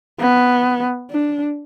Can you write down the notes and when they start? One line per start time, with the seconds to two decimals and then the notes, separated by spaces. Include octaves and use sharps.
0.20 B3
1.10 D4